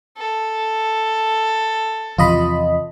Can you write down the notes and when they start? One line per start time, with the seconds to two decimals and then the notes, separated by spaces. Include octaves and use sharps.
0.18 A4
2.18 E2 C3 F3 F4 D#5 B5